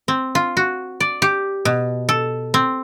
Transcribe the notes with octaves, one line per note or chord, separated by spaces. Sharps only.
C4
F4
F#4
D5
G4
B2
A4
C4